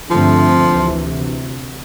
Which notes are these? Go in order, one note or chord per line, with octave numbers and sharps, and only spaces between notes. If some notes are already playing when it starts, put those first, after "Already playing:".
G2 D3 F3 A3 C4
D2 C3 E3